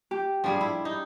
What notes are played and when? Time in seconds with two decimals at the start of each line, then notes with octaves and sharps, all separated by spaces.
0.11 G4
0.44 F3 G3 D4 G#4
0.61 E4
0.85 D#4